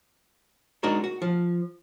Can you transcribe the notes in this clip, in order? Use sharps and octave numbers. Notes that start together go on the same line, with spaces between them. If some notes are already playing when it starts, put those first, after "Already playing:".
G#3 D4 D#4 F#4 A#4
F#4
F3